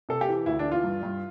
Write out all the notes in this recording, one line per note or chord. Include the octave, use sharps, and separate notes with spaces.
C3 A4
G4
E3
D2 E4
D4
E3
F4
G2
G2